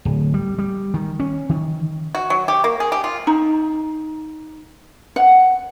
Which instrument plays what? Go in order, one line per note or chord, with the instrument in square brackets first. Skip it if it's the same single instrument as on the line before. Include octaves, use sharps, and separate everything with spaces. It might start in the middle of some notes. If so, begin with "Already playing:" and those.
[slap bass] D1
G3
G3
D#3
C#4
D#3
[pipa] F#4
F#3
G4
A#3
G#4
G4
F4
[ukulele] D#4
F#5